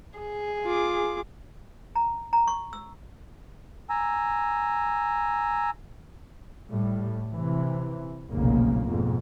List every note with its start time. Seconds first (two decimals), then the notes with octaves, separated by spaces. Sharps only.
0.19 G#4
0.64 F4 D6
1.96 A#5
2.33 A#5
2.48 C#6
2.73 E6
3.90 G#5 A#5 E6
6.70 A2 G3
7.31 C3 E3
8.31 F1 B1 A#2 C#3 A#3
8.87 F2 G#2 B2